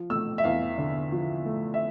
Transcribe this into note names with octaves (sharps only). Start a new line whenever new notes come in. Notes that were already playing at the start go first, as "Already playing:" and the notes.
Already playing: F3
A3 E6
E5
E2 F5
D3
F3
A3
E5